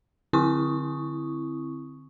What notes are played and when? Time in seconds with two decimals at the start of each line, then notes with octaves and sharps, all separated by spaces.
0.33 D3 C4 E4 C#6 D#6